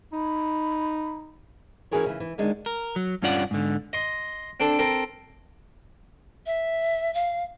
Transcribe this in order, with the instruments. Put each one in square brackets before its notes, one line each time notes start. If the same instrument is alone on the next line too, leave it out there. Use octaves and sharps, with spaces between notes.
[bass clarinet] D#4 [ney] B5
[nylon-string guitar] E3 C#4 F#4 G#4 A#4 C#5
C#3 E3
E3
D3 D#3 G#3 D4
[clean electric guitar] A#4
F#3
G2 C#4 F4 D5 F#5
G#2 D3
[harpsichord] D#5 C6
C4 D4 A4
C4 A4 A#4
[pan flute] E5
F5